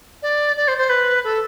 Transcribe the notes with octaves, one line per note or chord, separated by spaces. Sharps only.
D5
D5
C5
C5
B4
A4